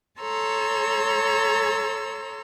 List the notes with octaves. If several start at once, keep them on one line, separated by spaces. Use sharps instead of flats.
A4 C#5 A#5 C6 E6